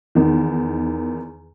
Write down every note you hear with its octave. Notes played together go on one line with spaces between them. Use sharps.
E2 D#3